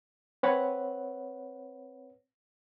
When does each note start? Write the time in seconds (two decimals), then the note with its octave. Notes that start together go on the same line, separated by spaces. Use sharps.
0.43 C4 B4 C#5 F#5